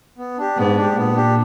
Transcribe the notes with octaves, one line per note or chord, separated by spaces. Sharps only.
B3
D4 G4
G#2 B3
D4 G4
A#2 B3
D4 G4